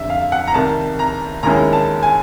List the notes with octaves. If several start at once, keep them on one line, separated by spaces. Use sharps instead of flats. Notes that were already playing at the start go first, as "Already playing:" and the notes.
Already playing: F1 F2 D3 E5
F5
F#5
A#5
C2 C3 D#3 A5
A#5
D#2 D#3 G#3 C#4 E4 A#5
A5
G#5